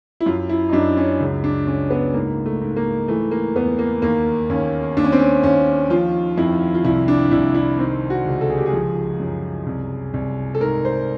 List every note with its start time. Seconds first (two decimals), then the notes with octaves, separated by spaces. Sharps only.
0.21 E4
0.26 F#2 F4
0.49 E4
0.69 D#4
0.73 F#2 D4
0.97 C#4
1.21 C#2
1.44 D4
1.67 C#2 C#4
1.90 B3
2.14 G#2 A#3
2.46 A3
2.61 G#2
2.76 A#3
3.08 E3 A3
3.31 A#3
3.55 E2 B3
3.79 A#3
4.02 D#2 A#3
4.50 D#2 C#4
4.97 D#2 D4
5.04 C#4
5.12 C4
5.19 C#4
5.43 D#2 C#4
5.90 F3 F4
6.37 F2 E4
6.74 F4
6.84 C2 E4
7.08 D4
7.31 C2 E4
7.55 E4
7.79 D#3 C4
8.10 F#4
8.26 C#2
8.41 A4
8.50 G#4
8.58 G4
8.66 G#4
8.73 F3
9.20 F#2
9.67 C2
10.14 C2
10.55 A4
10.60 G#2 A#4
10.85 C5